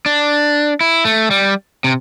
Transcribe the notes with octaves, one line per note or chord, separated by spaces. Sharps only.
D4
E4
A3
G3
C3